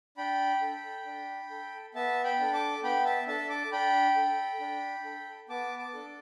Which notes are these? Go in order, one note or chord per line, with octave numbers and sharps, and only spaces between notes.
D4 G5 B5
A4
D4
A4
B3 E5 A5
G5 B5
D4 A4
A5 D6
B3 G5 B5
E5 A5
D4 A4 E5 A5
A5 D6
D4 G5 B5
A4
D4
A4
B3 A5 D6
A5 D6
D4 A4